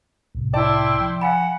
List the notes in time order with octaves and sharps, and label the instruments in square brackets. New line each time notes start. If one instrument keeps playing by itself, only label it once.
[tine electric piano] C2 A2 C3
[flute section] E4 G5 C6 [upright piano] D5 A5
[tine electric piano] F3
[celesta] F5 G#5 B5 [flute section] F#5